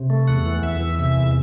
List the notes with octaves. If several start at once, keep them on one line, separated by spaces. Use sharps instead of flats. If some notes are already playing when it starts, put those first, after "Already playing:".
Already playing: C3
A3
E2 F#5
E3
E2 E5
E3
C3 E5
E2